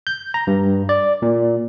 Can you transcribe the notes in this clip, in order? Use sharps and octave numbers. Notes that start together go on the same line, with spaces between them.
G6
A#5
G2
D5
A#2